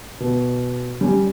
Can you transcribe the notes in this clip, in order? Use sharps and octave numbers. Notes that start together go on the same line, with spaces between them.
B2
G3 C#4